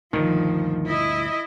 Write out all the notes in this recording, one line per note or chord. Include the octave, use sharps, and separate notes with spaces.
D2 G2 A#2 D#3 F3
E4 D#5